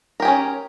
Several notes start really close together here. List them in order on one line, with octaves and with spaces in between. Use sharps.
A#4 G4 G#4 C#4